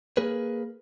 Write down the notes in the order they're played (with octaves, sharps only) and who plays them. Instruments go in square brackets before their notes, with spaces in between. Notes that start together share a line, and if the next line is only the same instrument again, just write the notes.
[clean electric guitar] A#3 G#4 A#4 B4